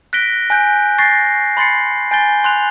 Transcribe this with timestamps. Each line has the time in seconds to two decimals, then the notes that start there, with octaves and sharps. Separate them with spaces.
0.13 F#6 A#6 B6 D7 G7
0.50 G#5 F#6 G6
0.98 C#6 A6 A#6 C7
1.57 B5 C6 A6 C7 C#7
2.11 G#5 G6 A6 G7
2.44 C6 F#6 F7